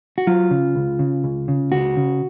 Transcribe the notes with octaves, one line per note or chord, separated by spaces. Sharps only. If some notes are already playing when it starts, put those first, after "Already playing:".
F#4
F#3 F4
C#3
C#2
C#3
C#2
C#3
C#2 F#4
C#3